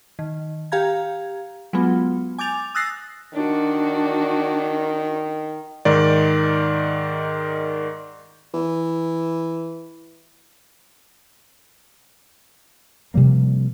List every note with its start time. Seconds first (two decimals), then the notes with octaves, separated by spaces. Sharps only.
0.19 D#3
0.72 G4 F5 A#5 G#6
1.73 F#3 G#3 B3 F4
2.38 G#5 D6 G6 A6 F7
2.75 D#6 E6 F#6 A6 A#6 C7
3.33 D#3 D4 F#4
5.85 G#2 D#3 D5
8.54 E3
13.14 C3 F3 G3 A#3